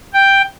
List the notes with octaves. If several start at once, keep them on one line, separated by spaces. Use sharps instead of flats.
G5